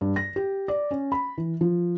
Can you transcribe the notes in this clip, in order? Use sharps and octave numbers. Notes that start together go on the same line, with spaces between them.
G2
A#6
G4
D5
C#4
B5
E3
F3